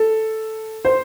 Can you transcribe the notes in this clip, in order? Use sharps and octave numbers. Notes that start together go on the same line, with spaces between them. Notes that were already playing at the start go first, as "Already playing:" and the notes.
Already playing: A4
C5